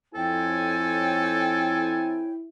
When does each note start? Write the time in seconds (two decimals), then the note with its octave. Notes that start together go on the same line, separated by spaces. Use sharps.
0.15 F2 C4 E4 A4 C#5 G5 G#5